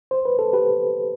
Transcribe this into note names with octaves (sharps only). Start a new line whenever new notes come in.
C5
B4
A4
G4 B4